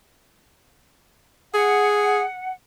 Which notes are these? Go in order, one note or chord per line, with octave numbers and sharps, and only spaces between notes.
G#4 F#5